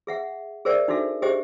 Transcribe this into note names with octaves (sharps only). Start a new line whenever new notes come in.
G#4 E5 F#5
G#4 A#4 C5 D5 E5 G5
D4 D#4 F#4 A4 E5
G4 G#4 C5 D#5 E5 G5